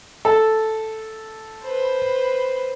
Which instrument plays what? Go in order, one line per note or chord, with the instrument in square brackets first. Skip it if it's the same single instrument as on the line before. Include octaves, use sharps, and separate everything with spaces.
[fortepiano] A4
[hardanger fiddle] B4 C5